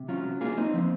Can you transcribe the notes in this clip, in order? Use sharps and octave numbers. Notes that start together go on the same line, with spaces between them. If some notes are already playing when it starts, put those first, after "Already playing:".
Already playing: C3
F#3 C#4 F4
F#3
A#3 F4 G#4
A#3 C4 D#4
F3 C4